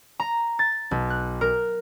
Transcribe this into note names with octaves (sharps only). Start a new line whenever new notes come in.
A#5
A6
B1
F#6
A#4